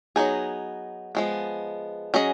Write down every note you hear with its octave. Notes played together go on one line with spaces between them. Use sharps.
F#3 B3 D#4 G#4
F3 G#3 B3
F#3 C#4 G#4 D#5